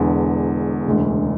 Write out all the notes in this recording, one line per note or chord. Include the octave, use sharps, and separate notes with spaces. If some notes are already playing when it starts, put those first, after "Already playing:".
Already playing: E1 E2 D3
E1 D2 C#3